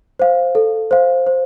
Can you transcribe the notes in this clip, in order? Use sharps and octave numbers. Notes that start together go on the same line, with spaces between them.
C5 F5
A4
C5 F5
C5